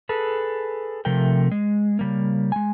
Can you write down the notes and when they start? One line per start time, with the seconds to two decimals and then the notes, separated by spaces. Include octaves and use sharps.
0.09 G#4 A4 B4
1.05 C3 F3 A3 A#4 G5
1.52 G#3
1.99 C#3 G3 A#3
2.52 G#3 G#5